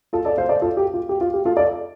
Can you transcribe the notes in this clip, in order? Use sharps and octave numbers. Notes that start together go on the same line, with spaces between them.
F4 A4
A4 D5
C5 F5
A4 D5
F4 A4
G4
F4
G4
F4
G4
F4 A4
A4 D5